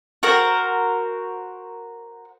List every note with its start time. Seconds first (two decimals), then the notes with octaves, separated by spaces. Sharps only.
0.23 F#4 A#4 C5